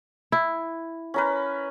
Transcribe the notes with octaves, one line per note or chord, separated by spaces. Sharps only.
E4
C#4 A#4 B4